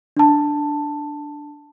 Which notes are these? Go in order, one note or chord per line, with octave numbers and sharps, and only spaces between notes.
D4 A5